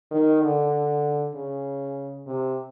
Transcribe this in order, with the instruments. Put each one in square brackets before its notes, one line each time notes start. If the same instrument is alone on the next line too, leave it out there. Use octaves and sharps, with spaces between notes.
[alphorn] D#3
D3
C#3
C3